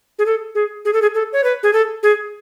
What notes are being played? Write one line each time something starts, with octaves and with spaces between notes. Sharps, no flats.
G#4
A4
G#4
G#4
A4
G#4
A4
C#5
B4
G#4
A4
G#4